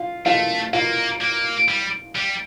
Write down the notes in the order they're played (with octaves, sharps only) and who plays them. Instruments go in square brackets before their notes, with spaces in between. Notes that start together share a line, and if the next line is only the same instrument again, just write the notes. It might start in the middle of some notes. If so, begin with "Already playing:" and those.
Already playing: [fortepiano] F4 F5
[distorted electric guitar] A3 [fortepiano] F4 F5
[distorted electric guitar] A#3 [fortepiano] F4 F5
[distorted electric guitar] A#3
G3
G3